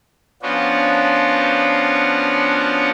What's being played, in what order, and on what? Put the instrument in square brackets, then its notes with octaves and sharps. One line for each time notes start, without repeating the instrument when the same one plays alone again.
[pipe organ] F3 B3 C#4 D4 F4 F#4